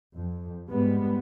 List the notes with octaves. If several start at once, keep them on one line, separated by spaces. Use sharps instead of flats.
F2
G#2 G3 G#3 B3